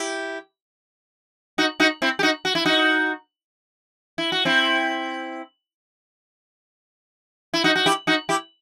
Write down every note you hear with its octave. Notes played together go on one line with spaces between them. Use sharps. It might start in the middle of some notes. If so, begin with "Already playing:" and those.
Already playing: E4 G4
D#4 F#4
D#4 F#4
C4 E4
G4
D#4 F#4
F#4
E4
D#4 F#4
E4
F#4
C4 E4
E4
D#4 F#4
F#4
E4 G4
D#4 F#4
E4 G4